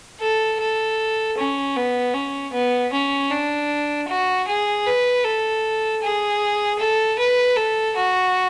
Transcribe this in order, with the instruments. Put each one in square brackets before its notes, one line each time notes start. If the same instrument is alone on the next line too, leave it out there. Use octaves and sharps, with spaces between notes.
[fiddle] A4
A4
C#4
B3
C#4
B3
C#4
D4
F#4
G#4
B4
A4
G#4
A4
B4
A4
F#4